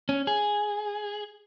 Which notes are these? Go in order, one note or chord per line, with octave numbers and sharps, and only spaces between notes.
C#4
G#4